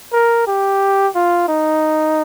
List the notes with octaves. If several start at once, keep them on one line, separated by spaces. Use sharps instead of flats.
A#4
G4
F4
D#4